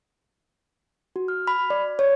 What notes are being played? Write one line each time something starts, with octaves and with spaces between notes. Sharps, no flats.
F#4
F6
B5
D5
C#5